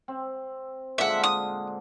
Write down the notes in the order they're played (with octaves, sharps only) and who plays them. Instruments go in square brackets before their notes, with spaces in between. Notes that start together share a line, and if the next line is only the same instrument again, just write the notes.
[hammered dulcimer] C4
[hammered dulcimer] A#2 D3 G#3 [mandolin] E5 F#5
[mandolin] D#6